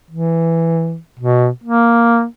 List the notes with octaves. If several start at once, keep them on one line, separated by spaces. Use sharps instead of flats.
E3
B2
A#3